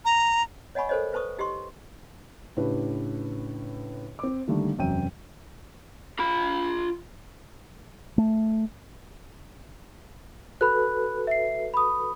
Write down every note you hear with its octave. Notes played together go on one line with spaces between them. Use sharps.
A#5
C#5 D#5 F#5 G#5 B5 C#6
A4 A#4 C5 C#5 D#5
B4 C5 A5 C#6 D#6
D#4 G4 D#5 C6 C#6
A2 C#3 D4 G4 B4
C4 D6
D3 D#3 G3 A3 A#3 D4
E1 F#2 C3 G5 D#7
F4 B5
A3
F#4 A4 B4 B5 F#6
E5 C7
B5 D#6